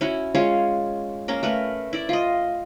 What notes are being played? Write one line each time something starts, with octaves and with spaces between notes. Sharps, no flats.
C#4 E4 F#4
G#3 C#4 F4 C#5
A#3 C#4 A#4
A3 A#4 B4
E4 D5
F4 D#5